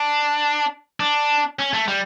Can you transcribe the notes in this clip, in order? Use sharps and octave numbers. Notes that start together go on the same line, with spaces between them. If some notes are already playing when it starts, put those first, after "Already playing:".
Already playing: D4
D4
C#4
A3
G3